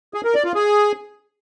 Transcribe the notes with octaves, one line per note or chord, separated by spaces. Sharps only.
G#4
A#4
D5
F4
G#4